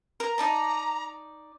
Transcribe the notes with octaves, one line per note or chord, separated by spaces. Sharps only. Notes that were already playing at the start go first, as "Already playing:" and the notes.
A#4 A#5
D#4 D5 A5